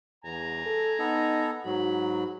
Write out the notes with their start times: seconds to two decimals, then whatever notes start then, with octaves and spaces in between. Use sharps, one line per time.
0.24 E2 G#5 A#5
0.65 A4
0.99 B3 D#4 A4
1.66 G#2 F#3 F#4 B5